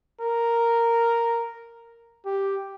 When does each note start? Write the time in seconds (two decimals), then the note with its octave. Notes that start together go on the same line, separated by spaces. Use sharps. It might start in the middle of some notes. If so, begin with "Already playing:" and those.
0.21 A#4
2.26 G4